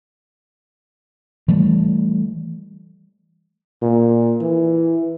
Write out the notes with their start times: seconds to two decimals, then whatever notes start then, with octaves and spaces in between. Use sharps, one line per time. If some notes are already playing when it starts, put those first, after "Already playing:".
1.48 E3 G3 A3
3.82 A#2
4.41 E3